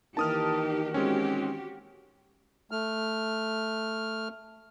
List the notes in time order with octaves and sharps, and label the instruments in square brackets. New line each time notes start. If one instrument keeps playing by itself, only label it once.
[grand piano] D#3 E3 A#3 [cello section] D#4 G4 [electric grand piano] A5 D#6 F6
[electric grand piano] G#3 C4 C#4 [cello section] F#4 G4
[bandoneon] A3 F6